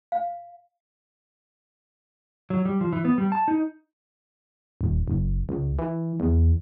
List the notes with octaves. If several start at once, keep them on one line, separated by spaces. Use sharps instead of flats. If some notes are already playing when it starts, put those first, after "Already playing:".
F5
F#3
G3
F3
E3
B3
G3
A5
D#4
D#1
F#1
C#2
E3
E2